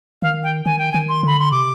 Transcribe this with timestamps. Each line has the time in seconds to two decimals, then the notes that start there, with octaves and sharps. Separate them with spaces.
0.22 D#3 F5
0.43 G5
0.65 D#3 G#5
0.79 G5
0.92 D#3 G#5
1.09 C6
1.23 D3 B5
1.39 C6
1.52 C3 D6